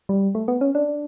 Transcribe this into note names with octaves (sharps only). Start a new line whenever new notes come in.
G3
A3
B3
C#4
D4